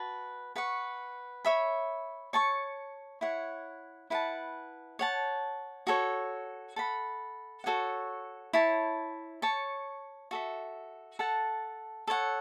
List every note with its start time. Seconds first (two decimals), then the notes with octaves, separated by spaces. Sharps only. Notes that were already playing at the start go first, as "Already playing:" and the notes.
Already playing: F#4 B4 A5
0.56 B4 F#5 C#6
1.45 C#5 E5 B5
2.33 C#5 A5 C#6
3.21 E4 C#5 F#5
4.10 E4 B4 F#5 A5
4.99 C#5 F#5 A5
5.87 F#4 A4 C#5
6.76 A4 F#5 B5
7.64 F#4 A4 C#5 F#5
8.53 E4 C#5 A5
9.42 C#5 A5 C#6
10.31 F#4 A4 E5
11.19 A4 F#5 A5
12.07 A4 C#5 F#5